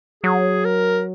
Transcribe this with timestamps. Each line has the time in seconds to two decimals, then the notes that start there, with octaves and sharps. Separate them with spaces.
0.24 F#3 G#4
0.65 A#4